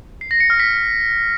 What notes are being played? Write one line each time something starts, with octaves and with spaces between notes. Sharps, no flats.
C7
A#6
C#7
F6
B6